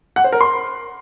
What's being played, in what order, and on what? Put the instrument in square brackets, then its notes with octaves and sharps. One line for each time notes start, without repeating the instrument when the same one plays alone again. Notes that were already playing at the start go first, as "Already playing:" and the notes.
[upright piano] F#5
C5
A#4
C6